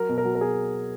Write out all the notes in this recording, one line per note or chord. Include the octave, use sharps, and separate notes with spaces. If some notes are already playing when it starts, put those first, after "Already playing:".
Already playing: F#3 A#4
B2
A#4
F#3
A#4
B2 G#4